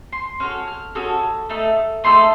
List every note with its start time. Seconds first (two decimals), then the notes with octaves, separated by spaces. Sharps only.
0.12 C6
0.40 C#4 F#4 A4 F6
0.68 F6
0.95 C#4 F#4 A4 D#6
1.49 A3 D#4 A4
2.04 A3 D#4 A4 C6